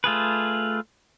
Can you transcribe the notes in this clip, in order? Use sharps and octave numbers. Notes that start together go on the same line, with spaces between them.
A3 F4 G#4 B4